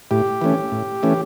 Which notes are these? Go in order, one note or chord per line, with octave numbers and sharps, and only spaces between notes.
A2 G4
E3 A3 C#4
A2
E3 A3 C#4